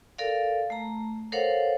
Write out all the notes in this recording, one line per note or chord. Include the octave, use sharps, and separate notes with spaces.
A4 A#4 D5 F5
A3 A#5
A4 A#4 C5 C#5 F5 F#5